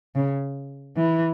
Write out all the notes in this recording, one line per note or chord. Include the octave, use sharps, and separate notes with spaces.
C#3
E3